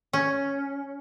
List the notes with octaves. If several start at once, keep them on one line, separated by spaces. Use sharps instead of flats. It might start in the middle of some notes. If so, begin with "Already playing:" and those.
C#4